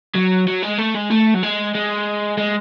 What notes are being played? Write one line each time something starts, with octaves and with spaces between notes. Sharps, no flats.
F#3
F#3
G#3
A3
G#3
A3
F#3
G#3
G#3
G#3